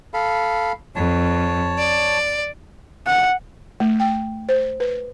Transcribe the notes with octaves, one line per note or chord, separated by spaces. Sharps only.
A4 F5 B5
F2 C#5 A5
D5
F#5
A3
G5
C5
B4